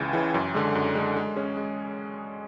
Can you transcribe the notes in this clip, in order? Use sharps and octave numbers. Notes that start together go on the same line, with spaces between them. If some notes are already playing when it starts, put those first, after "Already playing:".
Already playing: C#2 C#3 E3
C#3 E3
F#2
D3 G#3
F#2
D3 G#3
G#3
C#4 G#4
G#3